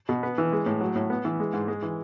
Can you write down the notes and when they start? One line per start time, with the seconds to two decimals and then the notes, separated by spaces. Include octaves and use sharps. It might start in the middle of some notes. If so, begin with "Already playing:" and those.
0.09 B2
0.23 B3
0.38 E3
0.52 G#3
0.66 A2
0.81 F#3
0.96 A2
1.10 B3
1.25 E3
1.40 G#3
1.53 G#2
1.68 G#3
1.82 E3